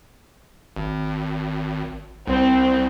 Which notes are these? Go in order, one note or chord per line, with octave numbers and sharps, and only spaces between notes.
G#1
C2 C4